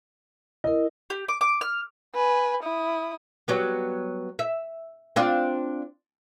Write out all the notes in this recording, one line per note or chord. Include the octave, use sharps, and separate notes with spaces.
E4 A#4 D#5
G4
D6
D6
F6
B4 G#5
E4 D#6
F#3 G3 B3
E5
C4 D4 F4